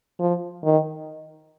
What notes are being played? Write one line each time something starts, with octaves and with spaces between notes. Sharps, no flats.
F3
D#3